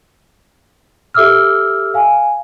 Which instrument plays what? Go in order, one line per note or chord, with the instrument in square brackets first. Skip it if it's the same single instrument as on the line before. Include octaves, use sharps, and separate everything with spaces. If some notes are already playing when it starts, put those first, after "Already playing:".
[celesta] G4 A4 E5 D6 E6 F6
F5 G#5